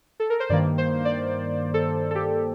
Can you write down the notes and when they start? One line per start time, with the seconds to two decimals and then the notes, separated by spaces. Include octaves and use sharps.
0.20 A4
0.30 A#4
0.40 C5
0.50 G2 D#3 A#3 D5
0.78 C5
1.05 D5
1.74 A4
2.11 A4
2.15 G4